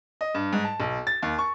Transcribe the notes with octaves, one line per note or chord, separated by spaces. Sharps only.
D#5
G2
G#2
A5
B1
A6
D#2
C#6